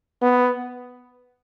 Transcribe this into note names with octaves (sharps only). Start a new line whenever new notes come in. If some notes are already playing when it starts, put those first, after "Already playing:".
B3